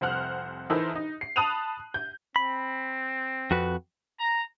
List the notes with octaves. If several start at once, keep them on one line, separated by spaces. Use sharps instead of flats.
F1 C2 C5 F#5 F6 F#6
E3 D#4 E4 A4 A#4 C5
D#4
C7
A5 B5 D#6 F#6 D#7 F7
G6
C4 B5
F2 F#4 B4
A#5